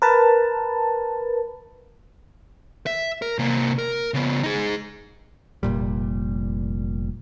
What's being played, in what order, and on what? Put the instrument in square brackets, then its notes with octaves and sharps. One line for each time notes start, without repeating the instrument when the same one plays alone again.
[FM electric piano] A#4 B4 A5
[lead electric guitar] E5
A#4
C3 A#3
A#4
C#3 B3
D#4 G#4
[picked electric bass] F1 A#2 G3